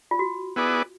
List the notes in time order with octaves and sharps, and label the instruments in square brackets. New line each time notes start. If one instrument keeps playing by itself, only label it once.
[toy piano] F4
F#4
[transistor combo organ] B3 E4 G#4 B4 D5